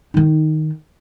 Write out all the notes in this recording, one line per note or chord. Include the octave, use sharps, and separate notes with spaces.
D#3 D#4